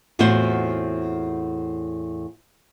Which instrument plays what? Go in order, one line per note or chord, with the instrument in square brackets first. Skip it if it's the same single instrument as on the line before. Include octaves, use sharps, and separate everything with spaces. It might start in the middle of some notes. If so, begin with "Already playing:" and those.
[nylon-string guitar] E2 A2 C4 F4 F#4 C5